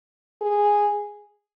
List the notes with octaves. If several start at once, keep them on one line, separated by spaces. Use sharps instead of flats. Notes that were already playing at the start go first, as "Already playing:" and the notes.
G#4